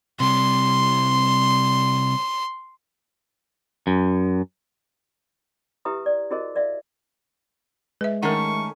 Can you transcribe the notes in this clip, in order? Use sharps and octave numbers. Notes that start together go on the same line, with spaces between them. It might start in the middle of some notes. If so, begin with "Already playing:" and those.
C3 G3 C6
F#2
E4 G4 B4 E5 A#5 D#6
D5
E4 F#4 G#4 A#4 C5 D#5
A#4 D5 E5 F5
G#3 B4 E5
D#3 A3 C#4 A#4 F#5 C#6